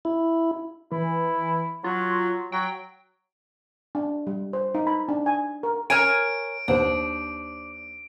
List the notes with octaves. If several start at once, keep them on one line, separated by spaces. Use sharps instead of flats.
E4
E3 E4
F#3 F4
F#3 G5
D4
G3
C5
D#4
B5
D4
G#5
A#4
A#4 C#5 G#5 D7
D#2 D4 C5